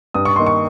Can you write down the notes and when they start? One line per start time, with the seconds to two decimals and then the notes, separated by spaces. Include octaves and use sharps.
0.14 G2 D#6
0.25 C#6
0.36 D#3 A#3 D#4 C6
0.47 C#6